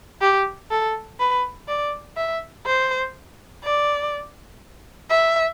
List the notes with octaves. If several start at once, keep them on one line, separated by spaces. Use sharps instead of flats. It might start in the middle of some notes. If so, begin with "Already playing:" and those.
G4
A4
B4
D5
E5
C5
D5
E5